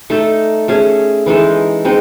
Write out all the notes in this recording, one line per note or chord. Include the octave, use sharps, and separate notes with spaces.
A3 D#4 A4
A3 C#4 G#4
E3 G#3 D#4 A4
G#3 C4 D#4